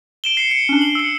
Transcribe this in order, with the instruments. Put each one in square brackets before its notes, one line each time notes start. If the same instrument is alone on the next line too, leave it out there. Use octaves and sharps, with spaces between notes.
[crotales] D7 E7 G7
C7 C#7
C#7
[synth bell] C#4 D4
F#7
[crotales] E6 C#7